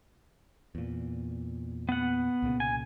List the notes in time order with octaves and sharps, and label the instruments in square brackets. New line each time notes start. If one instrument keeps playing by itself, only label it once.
[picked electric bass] E2 A#2
[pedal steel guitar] B3 F#5
[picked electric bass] C2 A#2 C#3
[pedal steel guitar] G#5